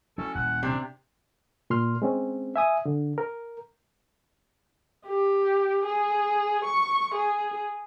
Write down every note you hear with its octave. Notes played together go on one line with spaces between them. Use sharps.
F#3 C#4 E4 A4 G#5
D#1 F#5
C3 D4
A#2 C6 F6
G#3 C4 C#4
E5 G#5 D#6
D3
A#4
G4
G#4
C#6
G#4